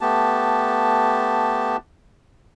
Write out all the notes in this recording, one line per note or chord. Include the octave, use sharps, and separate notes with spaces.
A3 B3 G4 A5